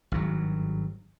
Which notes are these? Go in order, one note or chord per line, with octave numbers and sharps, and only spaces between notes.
G#1 G2 F#3